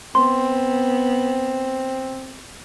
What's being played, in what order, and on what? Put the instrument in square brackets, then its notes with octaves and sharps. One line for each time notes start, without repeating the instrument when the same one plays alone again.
[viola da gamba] B3 [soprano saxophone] C4 [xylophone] C6